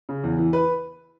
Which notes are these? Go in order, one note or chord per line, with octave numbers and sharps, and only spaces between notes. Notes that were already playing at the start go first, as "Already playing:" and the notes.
C#3
E2
E3
B4